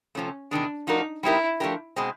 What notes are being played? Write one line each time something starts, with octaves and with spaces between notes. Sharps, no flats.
C3 F3 A3 C#4
E2 C3 D#3 G#3 D4
F3 A3 D4 D#4 F#4 A#4
G3 C4 D#4 E4 G4 A#4
F3 A3 D4 G4 A#4
B2 G#3 C4